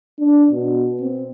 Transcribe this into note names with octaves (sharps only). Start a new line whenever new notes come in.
D4
B2
C4